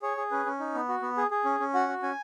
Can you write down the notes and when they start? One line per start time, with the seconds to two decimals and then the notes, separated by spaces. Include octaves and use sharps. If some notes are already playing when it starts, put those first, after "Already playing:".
0.02 G#4 C#5
0.17 G#4
0.31 C#4 B4
0.46 C#4
0.60 D#4
0.74 B3
0.89 F#4
1.02 B3
1.17 G#4
1.31 G#4
1.45 C#4
1.60 C#4
1.74 F#4 F#5
1.89 F#4
2.03 C#4 G#5